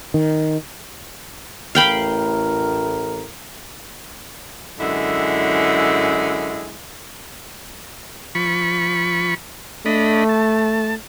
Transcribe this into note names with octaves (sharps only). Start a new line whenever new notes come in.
D#3
A1 A2 A#4 F5 G5 B5
F#2 D3 G#3 E4
F3 B5 C#6
A3 D4 D#5 B5
A5